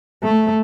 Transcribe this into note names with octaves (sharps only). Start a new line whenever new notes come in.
A3